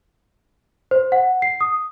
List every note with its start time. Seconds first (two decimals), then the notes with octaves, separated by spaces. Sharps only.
0.91 C5
1.12 F#5
1.42 C7
1.61 D#6